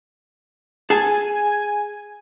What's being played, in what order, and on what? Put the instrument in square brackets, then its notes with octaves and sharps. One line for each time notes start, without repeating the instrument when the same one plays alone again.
[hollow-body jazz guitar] G#4 A5 [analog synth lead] G#5